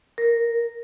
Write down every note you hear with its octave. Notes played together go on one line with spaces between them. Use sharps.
A#4